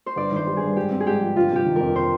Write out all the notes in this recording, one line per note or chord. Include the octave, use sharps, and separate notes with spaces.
C5
G1 D5
D#3 C5
G3
G2 G#4
G#2 G4
C4
G#4
G#2 G4
F3
G1 F4
C3 G4
D#3
A#4
F2
C5